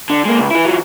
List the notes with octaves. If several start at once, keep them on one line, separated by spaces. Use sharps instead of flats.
D3
G#3 A#3
C#2
E3 E4
E3 F#3